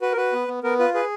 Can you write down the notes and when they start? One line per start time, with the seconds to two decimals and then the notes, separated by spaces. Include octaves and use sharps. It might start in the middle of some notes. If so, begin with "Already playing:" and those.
0.02 F#4 B4
0.12 A#4
0.17 F#4 B4
0.33 B3
0.48 B3
0.63 B3 A#4
0.79 F4 B4
0.94 G#4 B4